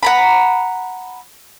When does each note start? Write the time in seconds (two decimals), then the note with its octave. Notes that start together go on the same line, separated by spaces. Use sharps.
0.03 F#5 A#5 B5